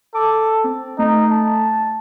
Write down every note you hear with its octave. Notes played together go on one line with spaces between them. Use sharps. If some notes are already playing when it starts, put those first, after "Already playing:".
A4 D6
C4
A3 D#4
A5